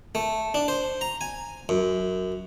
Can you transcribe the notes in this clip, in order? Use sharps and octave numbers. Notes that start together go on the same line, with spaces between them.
A3
D4
C5
A#5
G#5
F#2